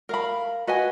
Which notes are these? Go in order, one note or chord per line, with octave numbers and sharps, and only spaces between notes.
A#4 F5 B5
F#4 B4 D#5 G#5